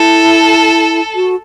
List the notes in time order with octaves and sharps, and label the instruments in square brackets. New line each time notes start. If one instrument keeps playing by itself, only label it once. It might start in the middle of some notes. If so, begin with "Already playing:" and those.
Already playing: [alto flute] E4 [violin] A4
[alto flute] F#4